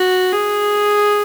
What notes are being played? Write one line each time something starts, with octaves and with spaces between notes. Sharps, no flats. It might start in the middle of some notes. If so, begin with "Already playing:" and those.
Already playing: F#4
G#4